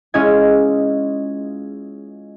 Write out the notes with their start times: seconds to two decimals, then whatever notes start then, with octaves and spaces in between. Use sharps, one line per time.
0.14 G#3 C#4 E4 F4 D#5 G#6